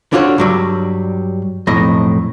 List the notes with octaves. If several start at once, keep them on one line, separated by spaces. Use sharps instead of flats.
D3 D4 F4 F#4 A#4 C#5
G2 F#3 G3
B1 F2 A2 D#5